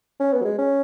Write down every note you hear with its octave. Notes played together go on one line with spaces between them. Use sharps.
C#4
B3
F#3
G#3
C#4